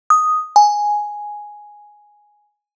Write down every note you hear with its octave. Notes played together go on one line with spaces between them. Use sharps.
D#6
G#5